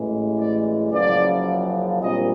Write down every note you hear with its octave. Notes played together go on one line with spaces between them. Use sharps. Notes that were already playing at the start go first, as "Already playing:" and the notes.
Already playing: A1 A2 E3 G#3
D5
F#1 F#2 C#3 F3 D5
A#1 A#2 G3 C4 D#5